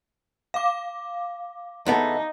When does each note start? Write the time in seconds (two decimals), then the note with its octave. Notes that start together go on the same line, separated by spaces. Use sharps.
0.54 F5 D6
1.86 E2 B3 D#4 A4